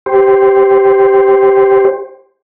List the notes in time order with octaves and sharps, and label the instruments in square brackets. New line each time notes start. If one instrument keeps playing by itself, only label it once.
[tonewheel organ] G4 C5